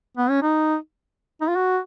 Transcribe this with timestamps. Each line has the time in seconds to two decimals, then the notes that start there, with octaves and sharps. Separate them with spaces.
0.17 B3
0.30 C#4
0.42 D#4
1.41 D#4
1.49 F4
1.56 F#4